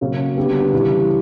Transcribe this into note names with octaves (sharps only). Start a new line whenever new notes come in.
C#3 F#3 A#3 C#4
D3 G3 B3
C#3 E3 G3